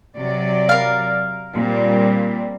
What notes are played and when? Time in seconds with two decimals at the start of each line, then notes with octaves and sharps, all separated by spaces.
0.17 C3 F#3 D5
0.69 A#4 F5
1.56 A#2 G3 C4